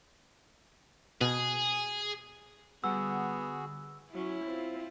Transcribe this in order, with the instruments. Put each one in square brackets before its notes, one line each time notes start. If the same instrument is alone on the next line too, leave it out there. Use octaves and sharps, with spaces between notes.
[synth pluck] B2 [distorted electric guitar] G#4
[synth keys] D3 G3 [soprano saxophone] B3 [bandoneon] F#4 G#4 [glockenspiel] E6
[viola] F#3 C#4 [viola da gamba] E4
[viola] C4 F4